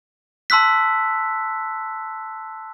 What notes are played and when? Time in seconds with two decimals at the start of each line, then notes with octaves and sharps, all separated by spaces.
0.50 A5 C6 E6 F#6 B6